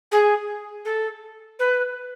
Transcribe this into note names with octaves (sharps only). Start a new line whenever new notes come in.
G#4
A4
B4